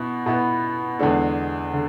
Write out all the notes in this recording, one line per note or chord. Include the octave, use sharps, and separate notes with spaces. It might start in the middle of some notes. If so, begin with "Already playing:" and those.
Already playing: B2 B3 E4
B2 B3 E4
E2 D3 G#3 D4 A4
D3